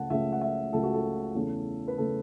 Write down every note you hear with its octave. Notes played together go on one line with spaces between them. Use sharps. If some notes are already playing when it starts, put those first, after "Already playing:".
Already playing: C#2 C#3 A3 F#5 A5
C#2 C#3 A3 E5
F#5
E5
C#2 C#3 A3 A4
F#4
A4
E2 C#3 A3
B4
C#3 A3 A4